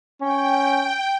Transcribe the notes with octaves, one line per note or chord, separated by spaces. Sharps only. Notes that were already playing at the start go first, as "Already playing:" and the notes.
C#4 G5